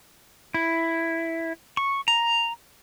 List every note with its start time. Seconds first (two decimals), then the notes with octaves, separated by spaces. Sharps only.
0.54 E4
1.77 C#6
2.08 A#5